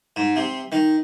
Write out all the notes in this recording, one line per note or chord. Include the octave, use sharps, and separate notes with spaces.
G#2
C3
D#3